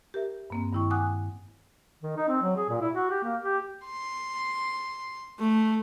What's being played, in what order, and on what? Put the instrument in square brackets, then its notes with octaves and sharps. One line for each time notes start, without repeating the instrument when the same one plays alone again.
[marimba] G4 A#4 E5
G2 A#3 C4
G2 D#3 E4 G5 C#6
F#5 G#5 D6 D#6 F#6
[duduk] D#3
D#4
C4
F#3
G#4
A#2
E4
F#4
G4
A#3
G4
[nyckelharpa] C6
[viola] A3